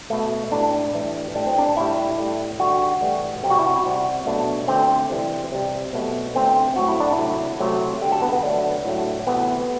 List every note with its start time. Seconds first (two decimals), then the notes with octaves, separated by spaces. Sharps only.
0.10 B2 A3
0.51 A2 G3 D4
0.94 A2 E3 G3
1.35 A2 G3 D4
1.47 C4
1.58 D4
1.76 A2 G3 E4
2.18 A2 G3
2.60 D3 G3 F#4
3.01 A2 E3 G3
3.43 C3 G4
3.47 G3 F#4
3.59 E4
3.66 F#4
3.85 C3 G3
4.26 B2 F#3 A3 D4
4.68 D3 A3 C4
5.09 C3 E3 G3
5.52 C3 G3
5.93 B2 F#3 A3
6.34 D3 A3 C4
6.76 A2 F#3 A3 F#4
6.89 E4
7.00 D4
7.12 E4
7.18 C3 F#3 A3
7.60 C3 F#3 A3
8.01 D3 G3 G4
8.12 A4
8.22 B3
8.32 B3
8.43 D3 F#3 A3 D4
8.85 A2 F#3 A3
9.27 C3 E3 A3 B3